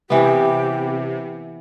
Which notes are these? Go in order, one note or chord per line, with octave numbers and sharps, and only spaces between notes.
C3 E3 B3 G4